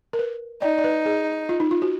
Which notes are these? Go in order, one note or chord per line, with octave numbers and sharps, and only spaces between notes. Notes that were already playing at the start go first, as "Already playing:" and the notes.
A#4
B4
D#4 D5
D5
B4
G#4
F4
D#4
F4
F#4